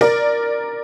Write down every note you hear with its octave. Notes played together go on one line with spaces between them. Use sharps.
A#4 D5